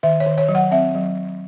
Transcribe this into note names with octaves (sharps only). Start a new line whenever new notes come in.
D#3 E5
C#5
D#3
C#5
F#3
F#5
C4 E5
F#3